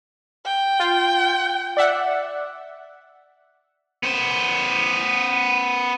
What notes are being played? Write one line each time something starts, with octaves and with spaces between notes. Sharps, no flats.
G5
F4
D5 E5 F#5
B3 C5